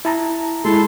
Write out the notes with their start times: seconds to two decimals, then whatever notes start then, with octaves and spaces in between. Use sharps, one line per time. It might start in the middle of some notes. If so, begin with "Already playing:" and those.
0.05 E4 A5 A#5
0.65 G#3 E4 A4 C6